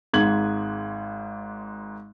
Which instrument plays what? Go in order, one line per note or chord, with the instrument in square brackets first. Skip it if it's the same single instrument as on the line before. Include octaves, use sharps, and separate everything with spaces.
[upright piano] G#1 G#2 G#6 F#7